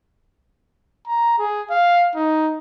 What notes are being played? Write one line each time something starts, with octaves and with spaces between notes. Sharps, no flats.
A#5
G#4
F5
D#4